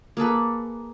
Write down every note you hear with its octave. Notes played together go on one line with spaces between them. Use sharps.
A#3 G#4 A4 B4